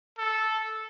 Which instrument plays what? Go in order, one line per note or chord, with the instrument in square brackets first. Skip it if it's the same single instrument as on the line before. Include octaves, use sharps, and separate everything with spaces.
[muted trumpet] A4